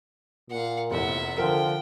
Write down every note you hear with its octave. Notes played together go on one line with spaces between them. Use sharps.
A#2 F5 F#5
F1 E2 E5 F#5
D3 F3 A#4 G5